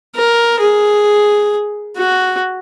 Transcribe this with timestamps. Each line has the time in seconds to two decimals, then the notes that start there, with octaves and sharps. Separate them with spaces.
0.15 A#4
0.60 G#4
1.97 F#4